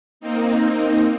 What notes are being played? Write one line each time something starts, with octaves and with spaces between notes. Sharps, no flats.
A#3 C4 D#4